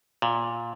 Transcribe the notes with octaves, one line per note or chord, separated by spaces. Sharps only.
A#2